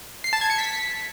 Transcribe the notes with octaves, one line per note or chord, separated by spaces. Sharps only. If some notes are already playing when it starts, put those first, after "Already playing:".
C7
A5
G#6
C#7
B6